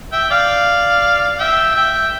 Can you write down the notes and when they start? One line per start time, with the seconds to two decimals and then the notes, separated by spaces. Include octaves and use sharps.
0.12 E5 G5
0.30 D5 F5
1.39 E5 G5
1.76 E5 G5